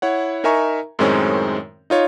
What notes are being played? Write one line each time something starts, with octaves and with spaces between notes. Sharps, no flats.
E4 C#5 F#5
D#4 A#4 E5 G#5 A#5 C#6
F#2 A2 D#3 G#3 C4 C#4
D#4 F4 C#5